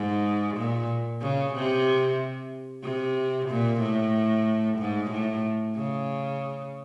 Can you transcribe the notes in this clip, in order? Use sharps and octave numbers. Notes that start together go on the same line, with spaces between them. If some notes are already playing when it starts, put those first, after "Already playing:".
Already playing: G#2
A#2
C#3
C3
C3
A#2
A2
G#2
A2
C#3